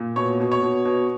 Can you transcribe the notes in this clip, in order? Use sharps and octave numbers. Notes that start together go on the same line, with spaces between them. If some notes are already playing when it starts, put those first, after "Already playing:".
Already playing: A#2
B2 C#5
B2
C#5
B2
B2